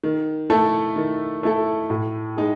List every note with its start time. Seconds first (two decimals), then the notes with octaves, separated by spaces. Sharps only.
0.04 D#3
0.50 A3 E4 A4
0.96 D#3
1.43 A3 E4 A4
1.90 A2
2.36 G#3 D#4 G#4